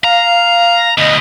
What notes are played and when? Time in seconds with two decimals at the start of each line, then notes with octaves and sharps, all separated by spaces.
0.04 F5 A#5
0.98 D2 B2 D#5